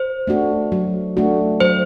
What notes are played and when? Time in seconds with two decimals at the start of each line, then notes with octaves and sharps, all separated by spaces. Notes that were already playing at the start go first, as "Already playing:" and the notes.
Already playing: C5
0.27 A3 D4 F#4
0.72 F#3
1.17 A3 D4 F#4
1.60 F#3 C5